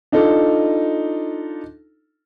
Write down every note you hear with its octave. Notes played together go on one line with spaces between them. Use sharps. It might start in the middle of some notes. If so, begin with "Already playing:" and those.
D4 D#4 F4 A4